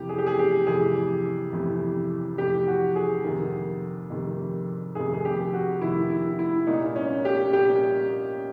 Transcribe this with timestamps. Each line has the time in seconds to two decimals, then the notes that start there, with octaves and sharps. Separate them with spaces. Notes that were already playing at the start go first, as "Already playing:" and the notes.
Already playing: F2 C3 E3 G4
0.09 G#4
0.18 G4
0.27 G#4
0.39 G4
0.67 F2 C3 E3 G#4
1.52 F2 C3 E3
2.38 F2 C3 E3 G4
2.68 F#4
2.95 G#4
3.24 F2 C3 D#3
4.10 F2 C3 D#3
4.95 F2 C3 D#3 G#4
5.13 G#4
5.25 G4
5.53 F#4
5.81 F2 C3 D#3 E4
6.10 E4
6.39 E4
6.67 C2 A#2 D#4
6.96 C#4
7.25 G4
7.53 C2 A#2 G4